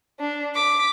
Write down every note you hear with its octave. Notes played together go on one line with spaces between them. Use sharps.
D4
D6 B6